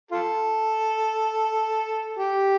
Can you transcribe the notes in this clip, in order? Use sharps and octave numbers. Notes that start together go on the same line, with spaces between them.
F4 A4
G4